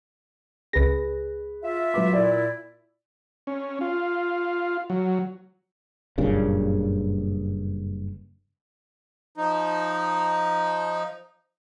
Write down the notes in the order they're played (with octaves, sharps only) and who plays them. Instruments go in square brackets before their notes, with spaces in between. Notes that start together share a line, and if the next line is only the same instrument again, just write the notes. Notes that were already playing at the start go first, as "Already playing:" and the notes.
[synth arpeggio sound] C#2 A#6 [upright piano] G#4 B4
[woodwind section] F4 E5
[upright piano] F#3 B4 D6
[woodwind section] A#2 E4 [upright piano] D5
[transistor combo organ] C#4
F4
F#3
[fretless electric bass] F#1 G2 A#2 C#3
[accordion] F3 D#4